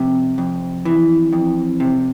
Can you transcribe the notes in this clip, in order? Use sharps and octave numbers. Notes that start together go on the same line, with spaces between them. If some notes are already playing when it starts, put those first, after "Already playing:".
Already playing: F2 C3
F2
E3
F2
C3